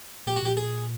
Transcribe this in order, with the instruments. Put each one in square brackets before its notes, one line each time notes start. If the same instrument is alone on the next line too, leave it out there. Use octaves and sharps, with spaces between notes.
[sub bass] A#2 [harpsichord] G4
[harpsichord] F#4
[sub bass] A#2 [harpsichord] G4
[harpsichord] G#4